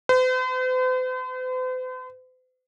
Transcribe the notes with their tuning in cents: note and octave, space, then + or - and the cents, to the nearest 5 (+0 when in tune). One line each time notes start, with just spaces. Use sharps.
C5 -45